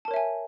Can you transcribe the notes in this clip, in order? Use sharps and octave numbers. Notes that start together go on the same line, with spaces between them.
A#4 C#5 E5 G#5 A5